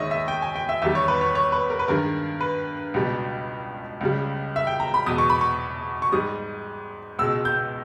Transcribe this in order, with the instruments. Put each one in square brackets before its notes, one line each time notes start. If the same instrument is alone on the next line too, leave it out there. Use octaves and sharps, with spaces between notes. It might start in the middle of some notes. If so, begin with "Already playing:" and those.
Already playing: [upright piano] D#2 D#3 G#3 C#5 D#5 E5
E5
G5
G#5
G5
E5
E2 D#3 G3 E5
C#5
B4
C#5
C#5
B4
A#4
B4
G2 D#3 G#3 A#4
B4
C#2 B2 G3
C#2 C#3 G3
E5
G5
A#5
B5
E2 B2 G#3 D#6
C#6
B5
C#6
C#6
G#2 G3 D#6
C#2 B2 G#3 E6
G6